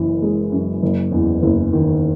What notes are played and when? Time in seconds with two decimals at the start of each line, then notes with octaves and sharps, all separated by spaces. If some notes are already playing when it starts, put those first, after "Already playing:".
Already playing: F#1 F#2 E3
0.22 G#3
0.52 F#2
0.82 F#1
1.12 E2
1.42 F#1
1.73 D#3